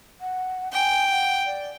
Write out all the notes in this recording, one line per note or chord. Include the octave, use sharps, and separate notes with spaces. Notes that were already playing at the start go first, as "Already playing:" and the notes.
F#5
G5 G#5
F#5
D5